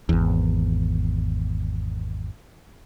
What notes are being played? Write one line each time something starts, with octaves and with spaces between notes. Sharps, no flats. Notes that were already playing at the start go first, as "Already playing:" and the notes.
G#1 E2